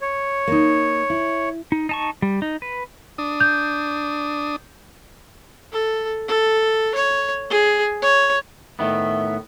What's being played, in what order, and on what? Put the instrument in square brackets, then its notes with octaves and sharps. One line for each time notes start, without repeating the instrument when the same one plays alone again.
[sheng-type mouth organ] C#5
[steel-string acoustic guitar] A#3 D#4
E4
[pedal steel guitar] D#4
D#4 A5 C#6
G3
D#4
B4
[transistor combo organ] D4 D#6
[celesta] G6
[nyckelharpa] A4
A4
C#5
G#4
C#5
[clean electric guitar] A2 D#3 B3 [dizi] E5